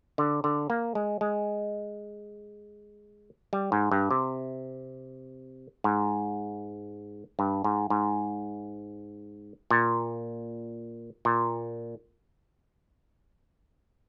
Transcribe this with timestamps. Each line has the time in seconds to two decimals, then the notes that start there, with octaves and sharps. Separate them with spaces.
0.18 D3
0.44 D3
0.70 A#3
0.95 G#3
1.21 G#3
3.53 G3
3.72 G#2
3.91 G2
4.11 C3
5.84 G#2
7.39 G2
7.64 G#2
7.90 G#2
9.71 A#2
11.25 A#2